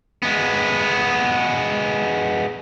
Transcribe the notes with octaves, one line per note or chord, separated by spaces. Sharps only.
G#3 B3